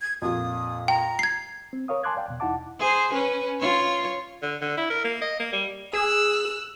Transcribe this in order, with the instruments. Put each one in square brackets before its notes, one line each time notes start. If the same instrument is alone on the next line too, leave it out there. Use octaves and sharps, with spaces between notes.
[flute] G#6
[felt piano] F2 A#2 [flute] D#6
[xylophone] G5 [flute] A#5
[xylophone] G#6 C7
[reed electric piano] C4
A#4 C#5 F5 D#6
G#5 A5 C6 D6 F#6 G#6
D5 F5 G5
E2 B2
E2 D#4 E4 F#5 A5 D6
[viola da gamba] G#4 C5
C#4 B4
F4 C#5
[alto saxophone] D3
D3
E4
A#4
A#3
D#5
A#3
G3
[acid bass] G#4 [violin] E6 F#6